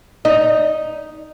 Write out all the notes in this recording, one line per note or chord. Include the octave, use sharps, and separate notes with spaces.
D#4